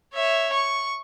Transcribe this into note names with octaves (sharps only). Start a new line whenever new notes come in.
C#5 E5
C#6